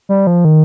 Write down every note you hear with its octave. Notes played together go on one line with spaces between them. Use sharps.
G3
F3
D#3